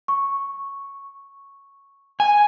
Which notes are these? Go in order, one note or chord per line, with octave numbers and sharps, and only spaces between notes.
C#6
G#5